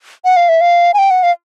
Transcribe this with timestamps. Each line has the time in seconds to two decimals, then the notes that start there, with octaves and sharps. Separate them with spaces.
0.25 F#5
0.37 F5
0.49 E5
0.61 F5
0.94 G#5
0.98 G5
1.11 F#5
1.23 F5